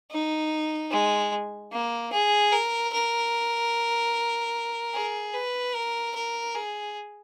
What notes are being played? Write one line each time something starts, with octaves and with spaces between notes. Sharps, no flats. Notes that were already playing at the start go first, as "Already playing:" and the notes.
D#4
G#3
A#3
G#4
A#4
A#4
G#4
B4
A#4
A#4
G#4